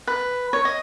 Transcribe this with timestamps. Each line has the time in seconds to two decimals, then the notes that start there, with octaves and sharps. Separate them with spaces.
0.07 B4
0.53 C#5
0.65 D#5